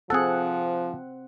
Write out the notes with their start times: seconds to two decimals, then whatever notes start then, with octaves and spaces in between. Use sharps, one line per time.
0.10 F3 C4 G#4 A4 F#5